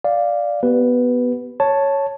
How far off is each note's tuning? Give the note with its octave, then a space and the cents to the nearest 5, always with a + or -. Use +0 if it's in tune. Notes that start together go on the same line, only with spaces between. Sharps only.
D5 +0 F5 +0
B3 +0 G4 -30 B4 +0
C#5 +0 A5 +0